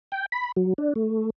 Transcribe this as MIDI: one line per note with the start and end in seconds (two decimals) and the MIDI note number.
0.12 0.26 79
0.32 0.52 83
0.56 0.73 54
0.78 0.93 62
0.96 1.30 57